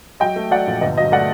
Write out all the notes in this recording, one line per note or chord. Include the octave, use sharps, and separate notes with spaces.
F#3 D#5 G5
A3
F#3 D5 F#5
A#1
G1 D#5
F#3 D#5
A3 D5 F#5